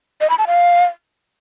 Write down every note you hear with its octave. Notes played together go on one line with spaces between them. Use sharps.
D#5
B5
A5
F5